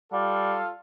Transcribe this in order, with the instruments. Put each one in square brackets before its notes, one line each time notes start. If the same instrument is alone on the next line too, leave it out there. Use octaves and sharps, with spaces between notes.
[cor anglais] G3 [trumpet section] F4 A4 F5